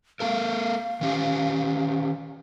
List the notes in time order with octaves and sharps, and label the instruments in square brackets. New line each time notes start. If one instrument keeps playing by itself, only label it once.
[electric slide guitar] A#3 A4 A#4 [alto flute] F5
[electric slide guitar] D#3 C#4 G4